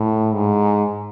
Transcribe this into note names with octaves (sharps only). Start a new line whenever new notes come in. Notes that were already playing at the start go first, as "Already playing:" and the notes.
Already playing: A2
G#2